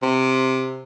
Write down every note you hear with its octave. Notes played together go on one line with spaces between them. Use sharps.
C3